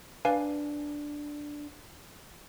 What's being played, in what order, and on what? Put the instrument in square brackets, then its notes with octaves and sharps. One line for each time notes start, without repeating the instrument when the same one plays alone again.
[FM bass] D4 [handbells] B4 F5 G#5